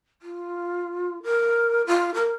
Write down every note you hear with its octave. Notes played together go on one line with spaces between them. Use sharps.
F4
A#4
F4
A#4